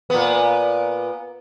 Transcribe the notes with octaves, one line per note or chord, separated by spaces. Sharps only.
A#2 B3